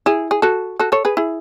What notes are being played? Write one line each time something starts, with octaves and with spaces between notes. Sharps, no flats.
E4 G#4
G#4
F#4 A4
F#4 A4
A4 C#5
G#4 B4
E4 G#4